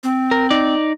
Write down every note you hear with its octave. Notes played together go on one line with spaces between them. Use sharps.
C4
A#4
D#4 D5